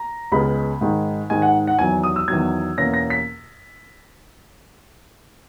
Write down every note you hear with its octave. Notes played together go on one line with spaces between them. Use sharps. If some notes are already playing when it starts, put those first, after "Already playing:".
Already playing: A#5
C#2 C#3 G#3 B3 B5
G#2 D#3 G#3
G#2 D#3 G#3 G#5
F#5
F#5
E2 D#3 F#3 G#5
D#6
E6
E2 D#3 F#3 G#6
E2 B2 A#3 C#4 A#6
A#6
B6